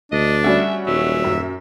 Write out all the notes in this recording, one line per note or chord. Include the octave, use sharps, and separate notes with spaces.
D2 D4 D#5
G3 C#4 F#4 E5
D#1 F#3 E5
F#2